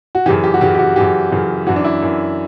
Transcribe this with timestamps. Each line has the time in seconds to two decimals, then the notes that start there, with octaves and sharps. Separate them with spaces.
0.15 F#4
0.26 F#2 C#3 E3 G4
0.44 G4
0.54 F#4
0.61 F#2 C#3 E3 G4
0.75 G4
0.79 F#4
0.96 F#2 C#3 E3 G4
1.32 F#2 C#3 E3
1.67 F#2 E3 F#4
1.76 D4
1.84 E4
2.02 F#2 E3